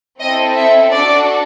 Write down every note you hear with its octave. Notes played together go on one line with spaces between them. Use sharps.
C4 E4 A4 D#5
E5
D4 F#4 A4 D5